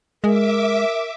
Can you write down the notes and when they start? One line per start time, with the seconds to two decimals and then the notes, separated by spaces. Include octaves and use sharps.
0.24 G#3 A#4 E5 D6